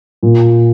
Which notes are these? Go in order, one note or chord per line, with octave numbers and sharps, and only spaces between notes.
A#2